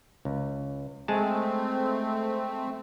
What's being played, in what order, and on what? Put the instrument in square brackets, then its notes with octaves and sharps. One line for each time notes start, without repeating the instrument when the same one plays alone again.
[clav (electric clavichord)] C#2
[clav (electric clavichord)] G#3 G#4 A5 [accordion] A3 C4